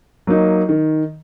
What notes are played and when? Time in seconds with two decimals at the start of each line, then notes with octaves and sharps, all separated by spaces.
0.27 F#3 A#3 D#4
0.69 D#3